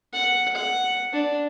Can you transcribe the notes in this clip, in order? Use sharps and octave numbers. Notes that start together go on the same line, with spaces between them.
F#5
F#5
D4